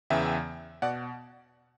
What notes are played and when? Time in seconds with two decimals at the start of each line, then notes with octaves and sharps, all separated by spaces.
0.10 E2 C#3 E3 E5 G5
0.82 B2 D5 F#5